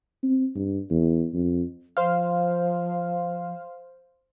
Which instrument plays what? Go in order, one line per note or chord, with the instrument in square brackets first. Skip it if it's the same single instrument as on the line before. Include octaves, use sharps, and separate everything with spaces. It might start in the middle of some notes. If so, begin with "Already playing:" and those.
[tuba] C4
G2
E2
F2
[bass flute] F3 [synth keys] C5 F5